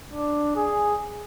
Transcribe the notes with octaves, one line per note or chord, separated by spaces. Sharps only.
D4
G#4